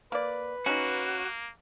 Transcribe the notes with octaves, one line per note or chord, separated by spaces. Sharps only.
A#3 B4 D5
A#3 C#4 D#4 F#4